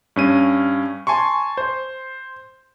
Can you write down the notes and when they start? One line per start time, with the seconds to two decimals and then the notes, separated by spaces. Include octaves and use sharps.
0.16 G2 C#4 D#7
1.07 G#5 A5 C6 C#6
1.57 C5